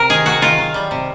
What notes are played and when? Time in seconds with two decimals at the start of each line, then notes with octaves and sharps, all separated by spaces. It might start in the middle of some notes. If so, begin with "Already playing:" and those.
Already playing: C3 A#4
0.09 D#3 G#4
0.26 C3 F#4
0.42 D#3 F4
0.58 F#3
0.74 G3
0.91 C3